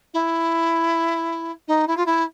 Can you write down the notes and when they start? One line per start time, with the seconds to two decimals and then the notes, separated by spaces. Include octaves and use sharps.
0.14 E4
1.68 D#4
1.87 E4
1.97 F4
2.06 E4